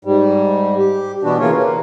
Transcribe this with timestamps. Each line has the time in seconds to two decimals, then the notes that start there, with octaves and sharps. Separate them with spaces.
0.05 G#2 G3
0.78 G4
1.23 B2 E3 B3 D4 F#4
1.39 C#3 E3 A#3 F4 C#5
1.54 A#3